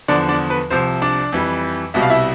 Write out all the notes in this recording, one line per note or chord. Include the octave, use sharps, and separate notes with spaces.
E2 D3 F3 D4 D5
D4 D5
B4
C2 C3 F3 C5
D4 D5
F2 E3 G3
C2 B2 G3 E5
F5
E4 E5